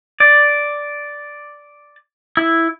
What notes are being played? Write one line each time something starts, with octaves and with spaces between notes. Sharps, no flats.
D5
E4